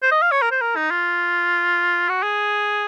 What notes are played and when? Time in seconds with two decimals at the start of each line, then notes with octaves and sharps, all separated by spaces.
0.03 C5
0.12 D#5
0.22 F5
0.32 C#5
0.42 A#4
0.51 C5
0.61 A#4
0.76 D#4
0.91 F4
2.09 F#4
2.23 G#4